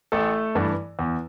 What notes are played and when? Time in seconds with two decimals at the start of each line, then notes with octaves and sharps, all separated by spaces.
0.12 A1 A3 A4
0.55 G2 E3
0.99 E2